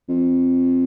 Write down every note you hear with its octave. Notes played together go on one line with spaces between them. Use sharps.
F2